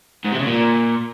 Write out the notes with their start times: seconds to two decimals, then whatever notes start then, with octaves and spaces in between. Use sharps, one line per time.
0.24 G#2
0.32 C3
0.39 C#3
0.47 A#2